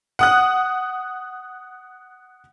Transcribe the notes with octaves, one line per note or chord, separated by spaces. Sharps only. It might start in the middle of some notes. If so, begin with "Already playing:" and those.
F#5 D#6 F#6